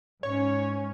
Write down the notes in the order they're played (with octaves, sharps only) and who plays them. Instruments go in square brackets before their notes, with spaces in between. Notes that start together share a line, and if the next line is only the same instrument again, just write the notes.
[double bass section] G#2 C#4 [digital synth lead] C#5